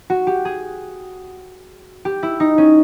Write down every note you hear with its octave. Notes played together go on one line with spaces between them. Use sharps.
F#4
G4
G#4
G4
E4
D#4
C#4